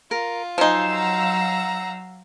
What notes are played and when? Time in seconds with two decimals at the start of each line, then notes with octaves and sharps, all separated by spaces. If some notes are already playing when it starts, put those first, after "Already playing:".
0.11 F4 A#4
0.58 F3 F#3 D#4 C5 F5 G#5 C6 E6
0.94 F#5 A#5